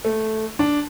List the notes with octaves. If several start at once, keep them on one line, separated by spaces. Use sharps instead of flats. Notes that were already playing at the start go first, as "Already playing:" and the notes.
A3
D4